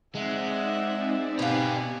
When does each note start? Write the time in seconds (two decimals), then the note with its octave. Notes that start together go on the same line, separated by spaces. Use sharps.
0.15 G#3 C4 D#4 D5 E5 F#5
1.39 B2 B3 G4 F5 G#5